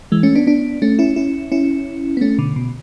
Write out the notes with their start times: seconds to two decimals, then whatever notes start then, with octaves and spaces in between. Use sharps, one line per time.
0.12 E3 G#3
0.23 A3 C#4
0.35 B3 D4
0.47 B3 D4
0.82 A3 C#4
0.99 C#4 E4
1.16 C#4 E4
1.52 C#4 E4
2.17 B3
2.21 A3 C#4
2.38 B2 D3
2.56 B2